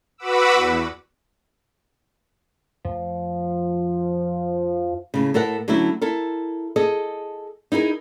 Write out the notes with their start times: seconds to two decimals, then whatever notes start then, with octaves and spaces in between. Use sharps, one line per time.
0.18 F#4 B4 F#5 B5 D6 E6
0.53 E2
2.85 F2 F3 A3
5.14 A2 C#3
5.34 A2 A4 A#4 E5 F#5
5.68 D3 F#3 A3 C#4 E4
6.02 E4 A4 A#4
6.76 G#4 A4 D#5
7.72 D#4 E4 G#4 A#4